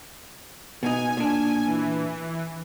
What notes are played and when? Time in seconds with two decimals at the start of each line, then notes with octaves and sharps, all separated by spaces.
0.83 B2 D#4 G#5
1.17 A#2 D4
1.67 E3